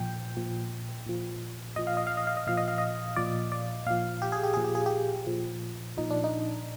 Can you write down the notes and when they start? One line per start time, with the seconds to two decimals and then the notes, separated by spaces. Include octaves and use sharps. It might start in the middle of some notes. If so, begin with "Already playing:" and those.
Already playing: A#2 F3 G5
0.36 A#2 F3
1.06 A#2 F3
1.76 A#2 F3 D#5
1.87 F5
1.97 D#5
2.07 F5
2.17 D#5
2.27 F5
2.37 D#5
2.47 A#2 F3 F5
2.57 D#5
2.68 F5
2.78 D#5
3.16 A#2 F3 D5
3.52 D5
3.86 A#2 F3 F5
4.22 G4
4.32 G#4
4.43 G4
4.54 A#2 F3 G#4
4.64 G4
4.75 G#4
4.86 G4
5.27 A#2 F3
5.97 A#2 F3 D#4
6.10 D4
6.24 D#4